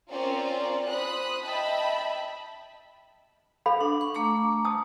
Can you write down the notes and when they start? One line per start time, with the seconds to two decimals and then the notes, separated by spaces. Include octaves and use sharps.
0.10 C4 C#4 F4 A#4 C5 D5
0.87 C5 B5 D#6 F#6
1.44 D#5 E5 G5 A5 B5
3.66 A4 F5 B5
3.81 D4
4.01 C#6
4.15 A3 A#5 D6
4.65 A5 D#6